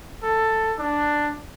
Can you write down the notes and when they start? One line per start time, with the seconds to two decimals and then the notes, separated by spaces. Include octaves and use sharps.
0.23 A4
0.79 D4